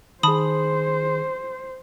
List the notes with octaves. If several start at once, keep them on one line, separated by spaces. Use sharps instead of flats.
D#3 G#4 C5 A5 B5 D#6